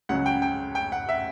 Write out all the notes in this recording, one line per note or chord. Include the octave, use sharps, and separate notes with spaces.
C#2 C#3 F#3 F#5
G5
G5
G5
F#5
E5